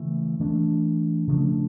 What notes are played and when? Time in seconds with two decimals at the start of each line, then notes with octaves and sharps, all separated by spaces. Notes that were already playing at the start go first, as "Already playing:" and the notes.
Already playing: C#3 E3 A3
0.40 E3 A3 D4
1.27 C#3 F3 A3 D4